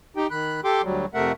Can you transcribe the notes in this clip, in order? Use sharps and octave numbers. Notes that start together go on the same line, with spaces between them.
D#4 G4 G5
D#3 B5 F#6
G4 A4 G5 C6 D6
D2 F#3 G3
F2 C3 A3 A#4 E5 F#5